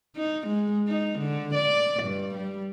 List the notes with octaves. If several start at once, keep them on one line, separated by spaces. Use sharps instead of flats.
D#4
G#3
D#4
D3
D5
G2
G3